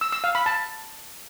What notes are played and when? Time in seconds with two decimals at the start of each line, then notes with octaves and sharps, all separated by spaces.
0.01 E6
0.13 E6
0.24 F5
0.35 B5
0.46 A5